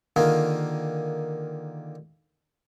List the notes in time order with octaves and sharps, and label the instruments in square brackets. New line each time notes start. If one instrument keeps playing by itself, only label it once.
[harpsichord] D3 D#3 A#3 F4 G#4